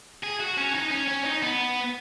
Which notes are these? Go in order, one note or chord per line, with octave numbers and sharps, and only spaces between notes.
G#4
F#4
C#4
D#4
C#4
C#4
D#4
B3